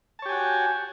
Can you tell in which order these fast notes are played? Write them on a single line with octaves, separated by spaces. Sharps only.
A5 C#5 G4 G#5 F#4